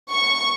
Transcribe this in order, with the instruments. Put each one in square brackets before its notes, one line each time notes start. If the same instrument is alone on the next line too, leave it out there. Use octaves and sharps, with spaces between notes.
[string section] C#6